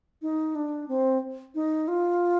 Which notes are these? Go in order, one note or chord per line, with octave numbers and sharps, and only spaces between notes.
D#4
D4
C4
D#4
F4